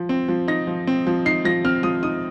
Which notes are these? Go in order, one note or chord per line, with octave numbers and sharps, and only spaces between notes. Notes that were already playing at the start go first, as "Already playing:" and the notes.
Already playing: F3
C4
F3
D#4 A#6
F3
C4
F3
D#4 C7
F3 A#6
C4 F6
F3 D#6
D#4 D#6